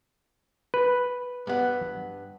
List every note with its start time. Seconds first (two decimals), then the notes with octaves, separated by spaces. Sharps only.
0.74 B4
1.47 G2 B3